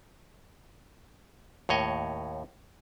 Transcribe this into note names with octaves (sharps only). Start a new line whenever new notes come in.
D#2 A2 C#5 D#5